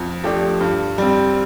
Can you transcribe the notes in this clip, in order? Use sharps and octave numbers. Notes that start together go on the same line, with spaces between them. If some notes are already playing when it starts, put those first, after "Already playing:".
Already playing: F2
F3 A3 D4 G4
G2
G3 C4